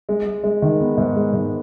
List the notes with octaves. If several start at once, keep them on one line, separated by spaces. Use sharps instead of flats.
G#3
G#3
G#3
D#3
B3
G#2
G#3
G#2